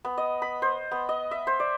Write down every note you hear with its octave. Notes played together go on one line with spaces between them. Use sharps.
B3
D#5
B5
C5
B3
D#5
E5
C5
D5